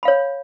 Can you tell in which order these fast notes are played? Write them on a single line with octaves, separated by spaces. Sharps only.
B5 F5 C#5